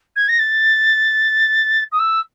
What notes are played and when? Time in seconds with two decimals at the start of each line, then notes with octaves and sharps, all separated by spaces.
0.16 G#6
0.28 A#6
0.39 A6
1.92 D#6
1.99 E6